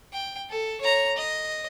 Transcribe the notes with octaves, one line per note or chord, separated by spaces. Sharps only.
G5
A4
C#5 A#5
D#5